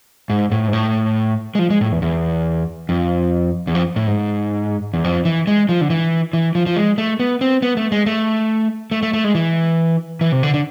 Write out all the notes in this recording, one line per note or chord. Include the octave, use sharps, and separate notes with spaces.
G#2
A2
G#2
A2
G#3
F3
G#3
A2
E2
E2
F2
E2
F2
A2
G#2
E2
F2
E3
G#3
F3
D3
E3
E3
F3
F3
G#3
A3
B3
C4
B3
A3
G#3
A3
A3
A3
A3
G#3
E3
E3
C3
D3
D3